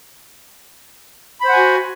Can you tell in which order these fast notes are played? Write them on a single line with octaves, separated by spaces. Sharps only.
B5 C5 F#5 G#5 F#4